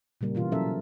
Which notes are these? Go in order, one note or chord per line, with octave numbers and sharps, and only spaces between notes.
A#2 C#3 G3 A#3
B2 E3 F4
F#3 C#4 A4 A#4 E5